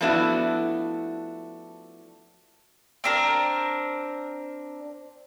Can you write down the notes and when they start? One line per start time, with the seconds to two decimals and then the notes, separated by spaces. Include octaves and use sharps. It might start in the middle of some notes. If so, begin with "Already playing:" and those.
0.01 F3 A3 B3 D4 E4 F#4
3.04 C4 D4 A#4